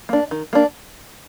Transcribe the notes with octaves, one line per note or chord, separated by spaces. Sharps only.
A#3 D4
D#3
A#3 D4